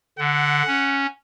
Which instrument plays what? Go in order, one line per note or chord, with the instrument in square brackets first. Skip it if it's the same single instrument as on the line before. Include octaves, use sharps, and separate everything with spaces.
[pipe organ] D3 [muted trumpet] F#5
[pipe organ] C#4